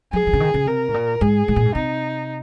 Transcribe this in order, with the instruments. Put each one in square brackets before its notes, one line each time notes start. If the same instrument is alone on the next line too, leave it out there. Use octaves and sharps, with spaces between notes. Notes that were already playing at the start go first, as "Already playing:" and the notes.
[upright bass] F#3 [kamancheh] G#4
[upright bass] F3
C#3
D#3
C#3
[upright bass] C3 [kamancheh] A#4
[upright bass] G#2
A#2
[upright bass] G#2 [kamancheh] G#4
[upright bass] G#2
A#2
G#2
[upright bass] C3 [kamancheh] D#4